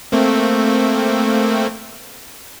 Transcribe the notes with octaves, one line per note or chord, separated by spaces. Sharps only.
A3 A#3 C4